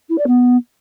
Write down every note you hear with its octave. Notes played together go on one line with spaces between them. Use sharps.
E4
D5
B3